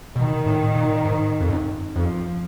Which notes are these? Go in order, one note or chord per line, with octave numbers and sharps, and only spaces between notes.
B2 D#3
A2
A#2
G#2
F2
F#2
F2 F3